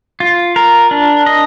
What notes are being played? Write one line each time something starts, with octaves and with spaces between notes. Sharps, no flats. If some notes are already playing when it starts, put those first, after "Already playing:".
F4
A#4
D4
D#5